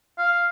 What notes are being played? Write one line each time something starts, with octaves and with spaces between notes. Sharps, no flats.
F5